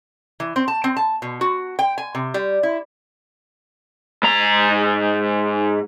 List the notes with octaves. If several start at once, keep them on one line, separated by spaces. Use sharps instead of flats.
E3
C4
A5
C4
A5
B2
F#4
G5
G#5
C3
G3
E4
G#2 A#5